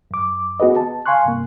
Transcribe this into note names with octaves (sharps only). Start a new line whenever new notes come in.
F#2 D6
B3 F#4 G#4 B4 D#5
A5
F5 G#5 C6 C#6 F#6
G2 C3 A#3